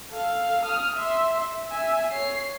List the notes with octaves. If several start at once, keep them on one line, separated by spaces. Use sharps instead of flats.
A4 F5
D#6 F6
E5 C6
E5
E5 G#5
C#5 C7